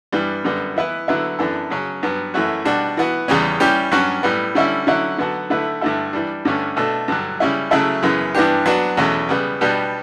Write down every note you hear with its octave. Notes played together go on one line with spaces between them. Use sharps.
G2 E3 G3 B3
F#2 D3 G3 B3
E3 B3 E4 B4
D3 F#3 B3 E4
F#2 E3 B3 D4 A4
C#3 F#3 C#4
G2 F#3 B3
F#2 E3 A3 C#4 F#4
B2 G3 D4 F#4
E3 B3 F#4
E2 C#3 G3 C#4
E3 G3 C#4 G4
G2 F#3 C#4 F#4
A2 G3 B3
D3 G3 C#4 E4
D3 F#3 C#4 E4
D3 F#3 B3 F#4 A4
D3 A3 E4 B4
G2 D3 A3 E4 A4
E3 G3 D4
G2 D3 A3 C#4
B2 A3 D4 A4
G2 D3 F#3
C#3 G3 C#4 E4
C#3 F#3 A3 E4 A4
F#2 C#3 E3 B3
G2 E3 B3 D4 G4
F#3 B3 D4 F#4
E2 B2 A3 C#4
C#3 G3 B3
B2 G3 B3 D4 G4